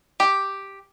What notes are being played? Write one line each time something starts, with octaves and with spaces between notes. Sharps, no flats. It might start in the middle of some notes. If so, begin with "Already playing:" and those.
G4